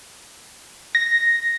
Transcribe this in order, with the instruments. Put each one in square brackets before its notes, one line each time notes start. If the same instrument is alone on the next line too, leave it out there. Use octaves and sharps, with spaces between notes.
[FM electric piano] A#6